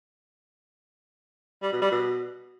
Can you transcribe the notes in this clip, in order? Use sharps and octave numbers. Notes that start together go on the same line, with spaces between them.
G3
B2
G3
B2